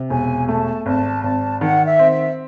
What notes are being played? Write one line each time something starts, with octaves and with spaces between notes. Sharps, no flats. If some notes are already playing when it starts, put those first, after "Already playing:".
Already playing: C3
E1 G#5
A3 A5
G#1 A5
G#1 A5
D#3 F#5
E5
C4
E5